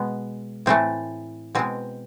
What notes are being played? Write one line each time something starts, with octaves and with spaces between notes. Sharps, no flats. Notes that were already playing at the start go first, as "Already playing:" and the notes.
Already playing: B2 G#3 B3
A2 E3 A3 C4
B2 G#3 C4